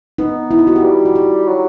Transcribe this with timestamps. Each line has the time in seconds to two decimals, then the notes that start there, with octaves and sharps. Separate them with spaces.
0.18 B3 D#4
0.51 E4
0.59 D#4
0.67 F#4
0.76 G4
0.83 G3
1.05 F#4
1.15 G4
1.48 F#3